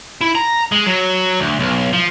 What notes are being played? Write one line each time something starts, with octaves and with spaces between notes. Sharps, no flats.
E4
A#5
G#3
F#3
D2
B1
F3